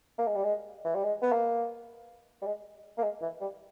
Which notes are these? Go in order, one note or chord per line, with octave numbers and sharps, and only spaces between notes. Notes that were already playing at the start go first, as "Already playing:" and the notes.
A#3
G#3
G3
G#3
E3
G3
G#3
B3
A#3
G3
G#3
A#3
G#3
E3
G3